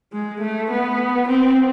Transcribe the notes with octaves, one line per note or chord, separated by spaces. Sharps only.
G#3
A3
B3
C4